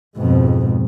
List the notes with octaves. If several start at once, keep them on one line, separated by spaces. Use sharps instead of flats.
F2 G#2 B2